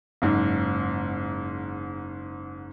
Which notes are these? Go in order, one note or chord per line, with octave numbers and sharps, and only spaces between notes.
F#1 G#2